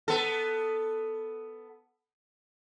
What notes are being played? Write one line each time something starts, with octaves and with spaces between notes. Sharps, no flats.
B3 A4